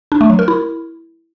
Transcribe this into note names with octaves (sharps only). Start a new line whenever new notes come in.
D4
A3
F#3
A#4
E4